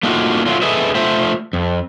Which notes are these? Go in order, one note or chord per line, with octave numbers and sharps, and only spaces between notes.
A3 A#3 D4 D#4 F4 F#4
F#3 A3 F4
G#4 A4 B4 D#5 E5
A3 F4 C5 E5
F2